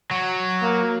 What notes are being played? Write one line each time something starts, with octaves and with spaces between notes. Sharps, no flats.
F#3
A#3